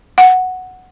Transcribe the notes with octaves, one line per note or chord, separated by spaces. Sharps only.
F#5